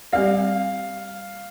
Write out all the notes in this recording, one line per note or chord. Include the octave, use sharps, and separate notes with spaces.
G3 C4 G4 D5 F5